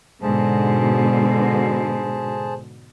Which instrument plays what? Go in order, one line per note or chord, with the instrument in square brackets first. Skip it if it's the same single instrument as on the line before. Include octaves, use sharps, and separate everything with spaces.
[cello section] G#2 B2 D3 [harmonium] G#4 C5 A5